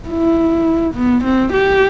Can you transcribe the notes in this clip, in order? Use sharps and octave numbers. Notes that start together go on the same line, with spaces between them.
E4
B3
C4
G4